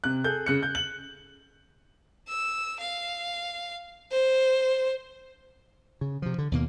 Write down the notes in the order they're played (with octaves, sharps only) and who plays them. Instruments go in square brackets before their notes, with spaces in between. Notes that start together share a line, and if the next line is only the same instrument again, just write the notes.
[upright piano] C3 F#6
G#4 A4 G6
C#3 F#6 C#7
G6
F#7
[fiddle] E6
F5
C5
[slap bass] C#3
C3 F3
D3
D#2 B2 A#3